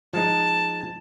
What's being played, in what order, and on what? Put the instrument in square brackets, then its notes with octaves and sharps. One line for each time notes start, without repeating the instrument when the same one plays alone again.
[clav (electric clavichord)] F3 G#3 D#4 [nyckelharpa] A5